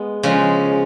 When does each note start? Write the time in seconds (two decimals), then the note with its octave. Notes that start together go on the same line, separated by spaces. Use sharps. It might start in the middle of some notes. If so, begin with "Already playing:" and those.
Already playing: G#3 B3
0.23 C#3 F3 G#3